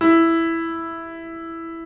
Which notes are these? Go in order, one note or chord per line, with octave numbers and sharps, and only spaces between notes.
E4